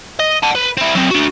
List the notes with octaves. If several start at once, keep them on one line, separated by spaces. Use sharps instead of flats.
D#5
F#5 A5
B4
C4 E4
F#3 C4
D4 F#4